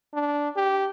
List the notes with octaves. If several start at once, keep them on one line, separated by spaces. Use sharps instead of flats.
D4
G4